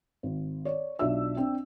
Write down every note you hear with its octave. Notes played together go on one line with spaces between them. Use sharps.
G#1
C#5 D5
B1 D4 F4 E5 E6
C4 D4